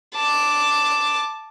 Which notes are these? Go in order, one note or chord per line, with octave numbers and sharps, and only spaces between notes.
A5 D6